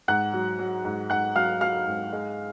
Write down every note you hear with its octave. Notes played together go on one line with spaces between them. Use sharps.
G#2 F#5 F#6
F#3
F#3
G#2
G#2 F#5 F#6
F#3 F5 F6
F#3 F5 F6
G#2
G#3